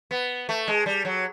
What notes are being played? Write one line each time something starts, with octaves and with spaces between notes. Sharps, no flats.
B3
A3
G#3
G3
F#3